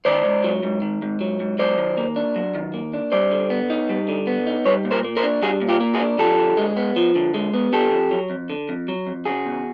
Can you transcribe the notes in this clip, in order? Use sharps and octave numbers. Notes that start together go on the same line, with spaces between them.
D#3 C5 D5
G#2
F#3
G#2
D#3
G#2
F#3
G#2
F#3 C5 D5
D#3
A#3
D4
F#3
D#3
A#3
D4
G3 C5 D5
D3
B3
D#4
G3
D3
B3
D#4
G3 B4 C#5
A#2
A#4 C5
A#3
A#4 C5
D4
G3 F#4 G#4
A#2
F4 G4
A#3
F#4 G#4
D4
F3 G4 A4
D3
G#3
B3
F3
D3
G#3
B3
D3 G4 A4
F2
F#3
F2
D3
F2
F#3
F2
C#3 F#4 G#4
E2